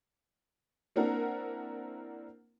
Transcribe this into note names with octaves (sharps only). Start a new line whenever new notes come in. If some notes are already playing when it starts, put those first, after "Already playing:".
A#3 C4 D4 E4 A#4 F#5